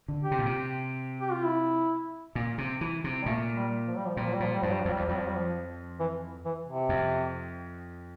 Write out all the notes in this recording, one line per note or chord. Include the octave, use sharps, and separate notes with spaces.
D3
G4
C3
A#2
C3
G4
F4
E4
A#2
C3
E3
C3
G3
A#2 A3
G3
F3
G3
F3
A#2 G3
F3
G3
A#2 F3
G3
G2 F3
G3
F3
F2 G3
E2 F3
F2 G3
F3
G3
F3
E3
E3
C3
F2